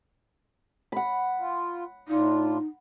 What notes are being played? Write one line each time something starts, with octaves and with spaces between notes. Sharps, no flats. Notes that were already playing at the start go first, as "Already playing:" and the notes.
F#5 B5
F4
A2 D4 D#4 F4